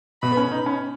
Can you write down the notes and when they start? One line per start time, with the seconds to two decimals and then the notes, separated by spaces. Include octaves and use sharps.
0.22 B2 B5
0.32 B3
0.37 C#4
0.52 D#4
0.66 C#4